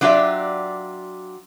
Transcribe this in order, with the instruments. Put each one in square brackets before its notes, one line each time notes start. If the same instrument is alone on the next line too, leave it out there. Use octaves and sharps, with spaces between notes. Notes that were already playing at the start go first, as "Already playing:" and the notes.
[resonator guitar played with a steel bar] F#3 D4 F4 G4 D5 E5